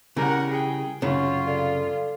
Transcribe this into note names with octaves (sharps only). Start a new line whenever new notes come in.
C#3 G3 E4 A#4 F#5
G#4 G5
C2 F#2 C#3 F4 C#5 F#5 C#6
A4 D5 F5